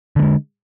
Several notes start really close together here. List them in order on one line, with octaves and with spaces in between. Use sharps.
D3 A3 G#3